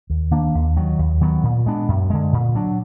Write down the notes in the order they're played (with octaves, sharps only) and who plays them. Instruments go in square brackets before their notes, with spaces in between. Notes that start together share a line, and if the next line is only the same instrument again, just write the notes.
[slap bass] D#2
D#3 A#3 D4
D#2
D#3 F#3
D#2
D#3 F#3 B3
A#2
G#3 B3 D4
F#2
D3 G#3
A#2
F#3 D4